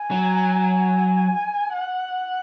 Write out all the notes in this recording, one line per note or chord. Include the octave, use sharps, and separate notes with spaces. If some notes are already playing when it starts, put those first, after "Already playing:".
Already playing: G#5
F#3
F#5